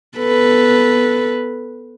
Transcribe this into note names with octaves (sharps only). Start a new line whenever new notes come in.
B3 A4 B4